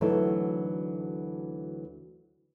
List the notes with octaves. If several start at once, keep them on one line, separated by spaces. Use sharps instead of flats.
D2 E3 F#3 D4 D#4 A4